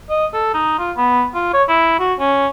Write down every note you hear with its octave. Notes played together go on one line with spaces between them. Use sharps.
D#5
A4
D#4
F4
B3
F4
C#5
E4
F#4
C#4